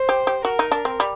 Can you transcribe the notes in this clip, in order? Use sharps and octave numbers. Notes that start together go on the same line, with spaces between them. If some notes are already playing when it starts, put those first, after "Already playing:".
Already playing: C5
G4
G4
F#4 A#4
D#4
D4
C4
G3